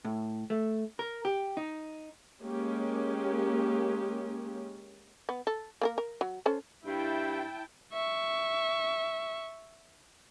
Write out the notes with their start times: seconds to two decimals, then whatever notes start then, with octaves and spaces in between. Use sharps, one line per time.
0.05 A2
0.50 A3
0.99 A#4
1.25 G4
1.57 D#4
2.44 G#3 A#3 C#4 G4
5.29 B3
5.47 A4
5.82 A#3 A4 A#4
5.98 A#4
6.21 F#3
6.46 C#4 A4 C5
6.86 G2 E4 G5 A5
7.93 E5 C#6